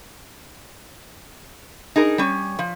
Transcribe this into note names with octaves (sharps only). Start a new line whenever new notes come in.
D#4 G#4 A#4
G3 C#4
F3